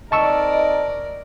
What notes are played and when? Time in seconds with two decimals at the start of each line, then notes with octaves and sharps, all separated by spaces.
0.12 C4 D#4 A#4 D5 D#5 A5 C#6 E6